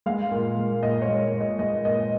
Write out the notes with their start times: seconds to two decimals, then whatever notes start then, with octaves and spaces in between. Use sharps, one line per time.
0.06 G#3 F5
0.31 A#2
0.56 G#3
0.82 A#2 D#5
1.02 C#5
1.08 G#3
1.34 A#2
1.41 D#5
1.59 G#3 D#5
1.85 A#2 D#5